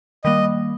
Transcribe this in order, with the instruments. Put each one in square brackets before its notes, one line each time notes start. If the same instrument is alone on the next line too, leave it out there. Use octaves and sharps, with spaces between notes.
[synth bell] D#3 G3 A#3 [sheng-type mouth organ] D#5